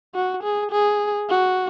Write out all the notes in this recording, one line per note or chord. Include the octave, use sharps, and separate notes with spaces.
F#4
G#4
G#4
F#4